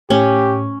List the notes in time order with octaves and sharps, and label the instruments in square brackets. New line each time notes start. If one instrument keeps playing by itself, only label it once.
[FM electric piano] A2 [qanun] C#4 [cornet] G4